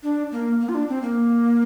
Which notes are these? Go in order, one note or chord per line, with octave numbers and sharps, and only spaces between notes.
D4
A#3
A#3
F4
D4
C4
A#3